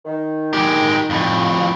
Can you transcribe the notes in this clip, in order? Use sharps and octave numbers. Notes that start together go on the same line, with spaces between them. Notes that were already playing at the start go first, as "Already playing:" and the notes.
D#3
G#3 G4
F2 A2